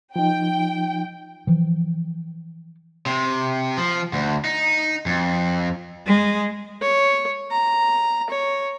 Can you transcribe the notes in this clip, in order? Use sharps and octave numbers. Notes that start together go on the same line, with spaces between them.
F3 D#4 G5
E3 F3
C3
F3
D2
D#4
F2
G#3
C#5
A#5
C#5